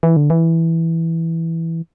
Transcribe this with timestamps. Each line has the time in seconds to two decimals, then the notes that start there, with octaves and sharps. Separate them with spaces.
0.03 E3
0.16 D3
0.30 E3